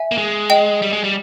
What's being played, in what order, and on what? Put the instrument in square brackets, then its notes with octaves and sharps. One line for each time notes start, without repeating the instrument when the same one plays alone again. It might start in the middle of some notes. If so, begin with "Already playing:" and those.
Already playing: [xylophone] E5 G#5
[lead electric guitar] A#3
G#3
[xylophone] D#5 G5
[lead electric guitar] G3
G#3
G3